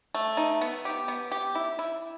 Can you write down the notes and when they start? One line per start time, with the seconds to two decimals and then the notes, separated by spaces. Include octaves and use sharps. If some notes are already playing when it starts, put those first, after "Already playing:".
0.15 A3
0.37 D#4
0.61 B3
0.85 G4
1.08 B3
1.32 G4
1.55 E4
1.79 E4